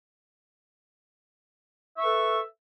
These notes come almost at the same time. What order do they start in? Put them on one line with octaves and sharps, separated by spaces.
E5 C#6 B4 A4